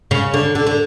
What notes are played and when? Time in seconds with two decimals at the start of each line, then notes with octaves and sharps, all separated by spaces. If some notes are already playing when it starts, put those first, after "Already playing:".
0.11 C#3
0.34 D3
0.55 D3
0.67 D3